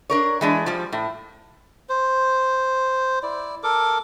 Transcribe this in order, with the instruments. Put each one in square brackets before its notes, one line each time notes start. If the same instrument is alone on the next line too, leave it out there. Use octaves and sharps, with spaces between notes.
[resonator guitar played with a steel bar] D4 A#4 C#5
E3 G#3 D4
F3 G3
A2
[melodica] C5
E4 D5
A4 A#4 D6